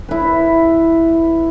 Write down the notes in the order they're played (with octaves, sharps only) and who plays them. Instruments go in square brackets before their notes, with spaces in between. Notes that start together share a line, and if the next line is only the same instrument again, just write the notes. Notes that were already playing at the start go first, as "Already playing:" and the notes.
[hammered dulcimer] E4 B4